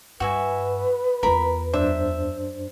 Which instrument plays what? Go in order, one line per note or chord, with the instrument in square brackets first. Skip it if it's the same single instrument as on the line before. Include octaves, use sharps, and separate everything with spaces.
[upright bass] G2 [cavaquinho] F#4 E5 G#5 [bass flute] B4
[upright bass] E2 F4 [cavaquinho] A#4 B5
[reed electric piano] F#2 D4 C5 [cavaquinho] E5